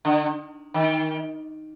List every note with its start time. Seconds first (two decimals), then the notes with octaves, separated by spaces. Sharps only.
0.05 D3
0.74 D#3